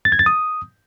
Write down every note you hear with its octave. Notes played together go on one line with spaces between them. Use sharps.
A6
G#6
A6
D#6